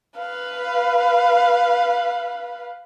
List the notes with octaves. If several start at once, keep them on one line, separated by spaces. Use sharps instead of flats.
B4 F5